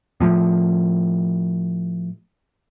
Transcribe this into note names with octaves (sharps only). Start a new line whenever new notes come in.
A2 F3